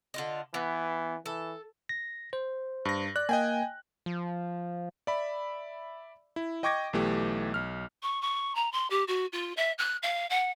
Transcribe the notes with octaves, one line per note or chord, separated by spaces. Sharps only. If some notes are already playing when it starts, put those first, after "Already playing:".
D3 F4 D#5
E3 B3
E3 A4
A#6
C5
G2 A#6
D5 F#6
A#3 D#5 G5 G#5
F3
D5 E5 B5
E4
D#5 G5 C#6 D6 G#6 A#6
B1 E3 A3 G4
B1 F6
C#6
C#6
A#5
C6
G4
F#4
F4
E5
F#6
F5
F#5